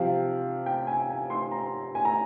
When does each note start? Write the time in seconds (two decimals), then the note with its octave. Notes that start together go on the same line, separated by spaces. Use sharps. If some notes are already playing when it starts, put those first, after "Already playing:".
Already playing: C3 F3 F5
0.66 G5
0.87 G#5
1.10 G#5
1.30 C6
1.51 A#5
1.95 G#5
2.05 A#5